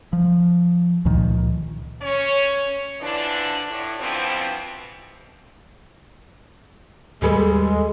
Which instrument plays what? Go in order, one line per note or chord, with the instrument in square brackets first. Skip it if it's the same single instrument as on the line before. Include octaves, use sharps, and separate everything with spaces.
[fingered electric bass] F3
C#2 A#2 D#3 F3
[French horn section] C#4 C#5
D3 E3 F3 D4
A2 D4
G2 B2 E3 F3 C4
[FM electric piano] D#2 [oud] G3 G#4 B4 [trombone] G#3 [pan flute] A4